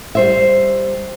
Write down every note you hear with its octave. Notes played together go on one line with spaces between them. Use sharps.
G3 C5 E5